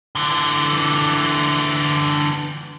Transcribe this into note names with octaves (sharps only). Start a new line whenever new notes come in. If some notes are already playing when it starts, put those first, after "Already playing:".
D3 E3